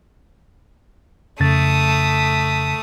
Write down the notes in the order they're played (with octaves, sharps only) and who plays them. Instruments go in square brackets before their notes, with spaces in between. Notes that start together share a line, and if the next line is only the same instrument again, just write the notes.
[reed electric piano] F2 C#3 A6 [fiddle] A3 D#6